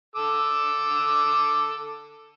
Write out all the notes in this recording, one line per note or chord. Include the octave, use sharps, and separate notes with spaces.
A4 D6 E6